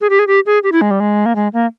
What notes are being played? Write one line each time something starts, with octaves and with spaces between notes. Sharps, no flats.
G#4
G4
G#4
G4
G#4
G4
E4
G#3
G3
G#3
A#3
G#3
A#3